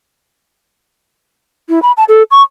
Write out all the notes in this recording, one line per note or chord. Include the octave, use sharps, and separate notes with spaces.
E4
B5
A5
A4
C#6